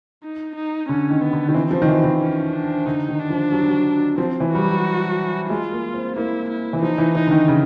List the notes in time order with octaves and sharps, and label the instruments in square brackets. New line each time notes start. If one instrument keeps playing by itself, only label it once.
[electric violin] D#4
D#4
[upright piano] D3 [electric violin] C#4
[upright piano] D#3
[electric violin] B3
[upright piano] D3
D#3
[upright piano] E3 [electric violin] C4
[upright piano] F3
D#3
E3
D#3
[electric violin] C#4
D4
[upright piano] D3 [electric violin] D#4
[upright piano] D#3
[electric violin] D4
[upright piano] F3
F#3
F3
F#3
[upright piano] F3 [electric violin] C4
[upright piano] E3
[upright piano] G3 [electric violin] F#4
[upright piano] F#3
[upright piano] G#3 [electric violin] F4
[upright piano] A#3
C4
[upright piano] A#3 [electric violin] E4
[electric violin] E4
[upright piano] E3
[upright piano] F3 [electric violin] D#4
[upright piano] E3
[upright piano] E3 [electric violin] D#4
[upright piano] D3
D#3
C#3